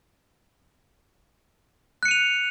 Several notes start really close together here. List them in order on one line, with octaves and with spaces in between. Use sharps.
F#6 C#7 D#7 F7